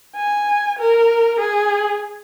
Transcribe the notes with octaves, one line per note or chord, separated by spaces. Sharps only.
G#5
A#4
G#4